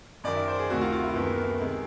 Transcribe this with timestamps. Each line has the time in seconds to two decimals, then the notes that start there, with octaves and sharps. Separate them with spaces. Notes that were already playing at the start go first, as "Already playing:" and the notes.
0.24 F#2 D#3 D5
0.36 E5
0.48 C5
0.59 G#4
0.70 D2 C3 D#3 F#4
0.81 F4
0.93 F4
1.03 E4
1.15 F#2 D#3 B3
1.27 A#3
1.38 A#3
1.49 A3
1.60 C3 D#3 G#3